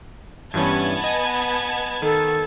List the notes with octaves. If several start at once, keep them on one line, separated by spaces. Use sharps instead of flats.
G2 E3 B3 C#4 A5 G#6
D#5 G#5
D#3 A4